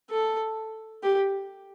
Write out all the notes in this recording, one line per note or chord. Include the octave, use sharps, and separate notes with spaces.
A4
G4